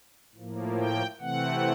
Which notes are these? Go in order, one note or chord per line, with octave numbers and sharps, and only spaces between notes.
A2 F3 A#3
G5
C3 E3 A3 C4 F#5